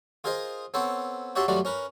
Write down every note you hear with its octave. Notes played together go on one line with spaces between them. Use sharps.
F4 G#4 A#4 C5 D#5
B3 C4 A4 C5 C#5
F#4 G4 C#5 E5 A5 C6
F#3 G3 A3 F4 F#4 D5
C#4 A#4 B4